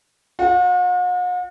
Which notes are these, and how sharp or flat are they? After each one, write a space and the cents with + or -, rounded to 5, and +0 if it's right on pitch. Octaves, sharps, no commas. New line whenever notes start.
F#4 -45 F#5 +0